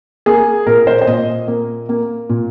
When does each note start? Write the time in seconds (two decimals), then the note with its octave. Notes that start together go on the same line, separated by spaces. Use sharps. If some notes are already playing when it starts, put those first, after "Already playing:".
0.26 A#3 G#4
0.66 A#2 A#4
0.87 C5
1.01 C5
1.07 A#2 D#5
1.48 A#3
1.89 A#3
2.29 A#2